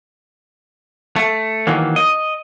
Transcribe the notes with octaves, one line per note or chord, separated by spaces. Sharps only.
A3
D#3 E3 F#3 A#3
D#5